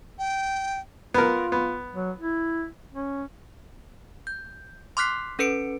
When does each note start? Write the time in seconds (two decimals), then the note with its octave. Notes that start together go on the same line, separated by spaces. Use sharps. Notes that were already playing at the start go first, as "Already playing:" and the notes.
0.19 G5
1.14 B3 F4 A#4
1.52 B3
1.94 F#3
2.19 E4
2.93 C#4
4.27 G6
4.97 C6 D6 F6 F#6 B6 C7
5.39 C#4 A4 B4 C#7 D7